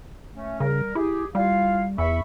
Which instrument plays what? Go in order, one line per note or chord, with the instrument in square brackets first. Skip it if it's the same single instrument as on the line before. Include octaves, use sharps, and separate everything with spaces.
[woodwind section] A3 C#4
[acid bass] C#3 [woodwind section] G3 A#4
[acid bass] E4 [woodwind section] G4 G#4
[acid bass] G3 [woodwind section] E4 F4 F5
[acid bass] E2 [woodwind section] E5 B5 C#6